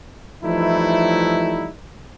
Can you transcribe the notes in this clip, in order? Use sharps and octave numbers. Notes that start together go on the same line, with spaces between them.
E3 F3 G3 A3 D#4 E4